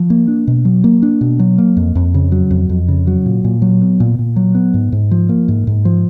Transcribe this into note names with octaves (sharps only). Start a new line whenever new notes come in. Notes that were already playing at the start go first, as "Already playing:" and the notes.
Already playing: F3
A#3
D4
B2
F#3
A#3
D4
B2
F#3
A#3
F2
F2
C#3
F#3
F2
F2
C#3
F#3
A#2
A#2
F#3
B3
A#2
A#2
F#3
B3
G#2
G#2
F3
A#3
G#2
G#2
F3